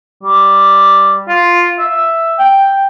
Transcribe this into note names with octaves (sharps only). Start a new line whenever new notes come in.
G3
F4
E5
G5